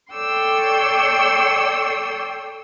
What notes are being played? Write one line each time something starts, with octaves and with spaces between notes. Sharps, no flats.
A4 C#5 D5 G5 C6 E6